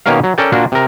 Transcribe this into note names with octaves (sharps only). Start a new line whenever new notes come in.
B2 D#3 A#3 C#4 A#4 F5
F#3
C#4 A4 A#4 D5 G5
A#2 A#3 D4 F4 F#4
C3 A#4